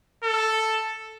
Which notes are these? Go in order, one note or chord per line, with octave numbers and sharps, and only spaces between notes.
A4